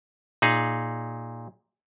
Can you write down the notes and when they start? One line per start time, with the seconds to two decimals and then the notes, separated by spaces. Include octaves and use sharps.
0.42 A#2 D#4 G#4